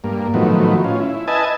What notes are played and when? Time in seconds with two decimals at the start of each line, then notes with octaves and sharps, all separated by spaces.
0.04 G2 A#3
0.34 A2 D#3 F3 F#3 B3
0.84 C#4 F4
1.00 E4
1.28 B4 D#5 E5 G#5 A5